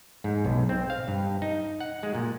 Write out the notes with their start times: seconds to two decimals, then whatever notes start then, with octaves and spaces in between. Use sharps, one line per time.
0.24 G#2
0.45 B1
0.69 C4
0.90 F5
1.08 G2
1.42 D#4
1.80 F#5
2.03 G#3
2.15 A#2